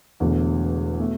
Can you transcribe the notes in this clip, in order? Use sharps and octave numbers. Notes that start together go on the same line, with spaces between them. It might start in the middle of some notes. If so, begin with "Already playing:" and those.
E1 E2 D3 A3
B2 A3